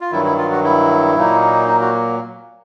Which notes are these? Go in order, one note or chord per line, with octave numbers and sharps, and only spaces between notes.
F4
G2 D#3 F#3 E4
E4
F4
F#4
E4
A#2 F#3 A#3 D#4
D#4
F#4